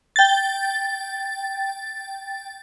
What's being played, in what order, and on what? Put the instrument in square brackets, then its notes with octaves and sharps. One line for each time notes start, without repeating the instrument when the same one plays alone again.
[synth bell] G5 A6